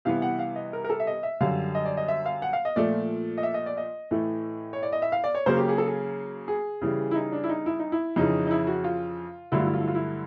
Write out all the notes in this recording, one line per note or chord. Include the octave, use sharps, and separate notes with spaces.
C3 E3 G3 B3 F5
F#5
F5
D#5
A#4
A#4
A4
E5
D#5
E5
F#2 D3 G3 F5
D#5
D5
D#5
E5
F5
F#5
F5
D#5
A#2 F3 A3 D5
D#5
E5
D#5
D5
D#5
A2 E3 A3
C#5
D5
D#5
E5
F5
D5
C#5
C#3 F#3 A#3 C5
G4
G#4
A4
G#4
G#4
C#3 E3 G3
E4
D#4
D4
E4
D#4
E4
D#4
E4
F2 C#3 E3 D#4
D#4
E4
F#4
F4
G2 D3 F#3 A3 E4
F4
E4
F4
E4
F4
E4